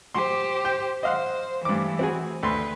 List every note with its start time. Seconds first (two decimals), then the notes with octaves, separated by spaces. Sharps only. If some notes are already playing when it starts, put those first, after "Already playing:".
0.14 G4 C5 C6
0.65 G5
1.03 C5 D#5 F5 F#5
1.65 G2 E3 A3 D6
1.99 C4 F#4 G#4
2.43 D2 B4 C6